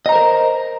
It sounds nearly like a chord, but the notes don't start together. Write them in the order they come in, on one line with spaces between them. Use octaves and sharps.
D#5 A#5 C5 A#4